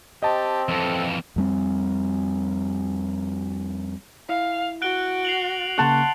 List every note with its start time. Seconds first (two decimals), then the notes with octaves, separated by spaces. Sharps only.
0.23 C4 G4 D#5 A5
0.69 F2 E3 A4
1.36 F2 G3 C4
4.29 E4 F5
4.82 F#4 F#6 D7 G7
5.25 C7 F7 F#7
5.78 C#3 A#3 F#5 A5 C6 C#6